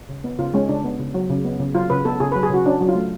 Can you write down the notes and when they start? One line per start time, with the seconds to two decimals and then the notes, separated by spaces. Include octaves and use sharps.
0.09 C#3
0.24 B3
0.39 C#3 F4
0.54 G#3 C#4
0.69 C#3 D4
0.84 B3
1.00 C#3
1.14 F#3
1.30 C#3
1.45 B3
1.60 C#3
1.75 F#3 F4
1.90 C#3 B4
2.05 B3 A4
2.20 C#3 G#4
2.32 B4
2.36 F#3
2.43 G#4
2.50 C#3 F#4
2.66 C#4 D4
2.80 F#3
2.89 F4
2.95 A3